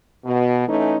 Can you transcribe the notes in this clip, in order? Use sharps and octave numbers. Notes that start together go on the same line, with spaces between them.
B2
E3 A3 C#4 D#4